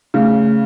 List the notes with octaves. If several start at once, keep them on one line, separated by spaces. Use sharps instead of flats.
C#3 A3